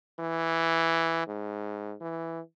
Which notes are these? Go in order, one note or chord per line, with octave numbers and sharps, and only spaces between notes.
E3
G#2
E3